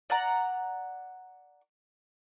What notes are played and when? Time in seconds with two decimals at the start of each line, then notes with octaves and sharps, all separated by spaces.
0.10 D5 F#5 A#5